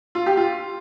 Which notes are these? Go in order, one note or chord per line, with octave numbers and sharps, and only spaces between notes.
F4
G4
F4